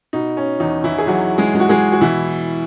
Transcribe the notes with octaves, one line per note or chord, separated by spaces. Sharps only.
B2 D#4
C#4
E2 D#4
E3 E4
G#4
E2 F#3 F#4
G#3 G#4
G#3
F#4
G#3 G#4
F#4
B2 E3 E4